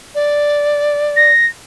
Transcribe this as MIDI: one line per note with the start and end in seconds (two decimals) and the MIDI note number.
0.15 1.31 74
1.16 1.46 94